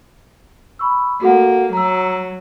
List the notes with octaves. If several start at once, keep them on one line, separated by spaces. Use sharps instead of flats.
B5 C#6 E6
A#3 F#4 A4 F#5
F#3 A#5 E6